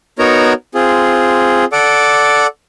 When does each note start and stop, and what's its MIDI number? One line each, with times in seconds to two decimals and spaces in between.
0.19 0.53 59
0.19 0.53 63
0.19 0.53 66
0.19 0.53 70
0.19 0.53 73
0.19 0.53 82
0.74 1.65 60
0.74 1.65 65
0.74 1.65 68
1.72 2.47 69
1.72 2.47 74
1.72 2.47 78
1.72 2.47 86